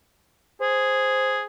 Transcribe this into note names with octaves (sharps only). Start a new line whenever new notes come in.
G#4 C5